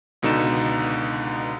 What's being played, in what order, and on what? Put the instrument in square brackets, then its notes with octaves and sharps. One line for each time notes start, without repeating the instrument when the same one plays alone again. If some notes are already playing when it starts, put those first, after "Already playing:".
[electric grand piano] C#2 B2 D3 D#4 E7